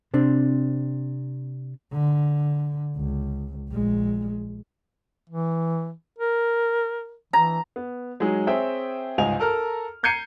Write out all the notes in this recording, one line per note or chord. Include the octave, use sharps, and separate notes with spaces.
C3 C4 D4
D3
C#2
A#1 G#3
E3
A#4
E3 A#5
B3
F#3 G#3 D#4 G#4
C4 G#4 C#5 E5 G5
G1 C#2 G#2 D#5 G#5 F7
A4 A#4 A#5 F6
A#5 G6 G#6 C7 C#7 D#7